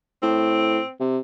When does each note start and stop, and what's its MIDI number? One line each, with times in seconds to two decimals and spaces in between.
0.23 0.79 45
0.23 0.92 60
1.00 1.19 48